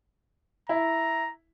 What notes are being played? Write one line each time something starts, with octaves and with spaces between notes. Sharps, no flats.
E4 A#5